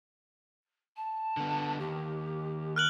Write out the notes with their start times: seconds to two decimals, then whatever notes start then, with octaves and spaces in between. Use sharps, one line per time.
0.97 A5
1.37 D3 B3
1.79 D#2 G4
2.76 A#4 F6 F#6 F#7